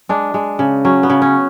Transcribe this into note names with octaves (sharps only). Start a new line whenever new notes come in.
G#3 D4
G#3
C#3
F#3 C#4
B3
C#3
C#4